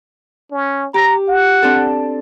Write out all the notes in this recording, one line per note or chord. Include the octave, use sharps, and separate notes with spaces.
C#4
G4 A#5
F#5
C4 D4 A4